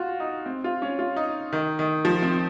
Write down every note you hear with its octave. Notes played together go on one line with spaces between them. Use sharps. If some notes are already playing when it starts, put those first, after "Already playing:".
Already playing: F4 F#4
D#4
C4
F4
C#4
F4
D#4
D#3
D#3
F3
C4